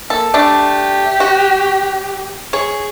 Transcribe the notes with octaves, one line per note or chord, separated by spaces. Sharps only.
A#3 A4
A3 D4 G4
F#4
G#4 C#5